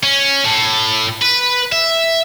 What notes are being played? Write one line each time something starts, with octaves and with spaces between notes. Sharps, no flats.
C#4
A2
B4
E5